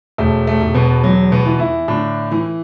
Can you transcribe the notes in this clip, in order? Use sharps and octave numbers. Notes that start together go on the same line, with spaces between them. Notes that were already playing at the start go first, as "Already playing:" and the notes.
E1 A3
A3
E1
B2 B3
E2 F#3
B2 B3
E3
E3 E4
A2 D3 D4
E3